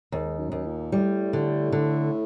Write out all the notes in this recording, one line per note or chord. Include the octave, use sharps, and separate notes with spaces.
D#2 G#2
F#2
D#2
A#2
A2 G3
D3
D3